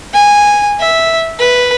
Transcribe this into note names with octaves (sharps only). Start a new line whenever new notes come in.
G#5
E5
B4